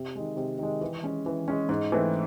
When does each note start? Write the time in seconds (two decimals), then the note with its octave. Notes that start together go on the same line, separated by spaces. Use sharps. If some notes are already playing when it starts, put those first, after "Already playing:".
Already playing: C3
0.16 D#3 G#3
0.37 C3
0.59 D#3 G#3
0.81 E3
1.03 G#3 C#4
1.26 E3
1.48 G#3 C#4
1.69 G#2
1.92 E3 A3 C4 E4